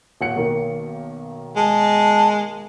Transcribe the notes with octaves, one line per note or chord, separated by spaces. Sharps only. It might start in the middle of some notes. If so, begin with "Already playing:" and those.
D#1 F#5 C#7
B1 D#3 A#3
G#3 A5